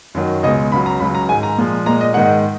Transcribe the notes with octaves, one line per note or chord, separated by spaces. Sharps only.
F#2 D#3 F#3
C#2 B2 G#3 D#5
C#2 C#3 F#3 B5
A#5
C#2 C#3 F#3 B5
A#5
G#2 D#3 G#3 G#5
A#5
A#2 F3 G#3
A#2 G#3 A#5
D#5
G#2 D#3 G#3 F#5